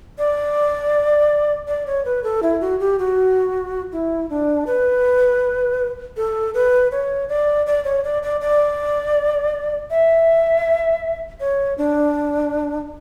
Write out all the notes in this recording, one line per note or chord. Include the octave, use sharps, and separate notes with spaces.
D5
D5
C#5
B4
A4
E4
F#4
G4
F#4
E4
D4
B4
A4
B4
C#5
D5
D5
C#5
D5
D5
D5
E5
C#5
D4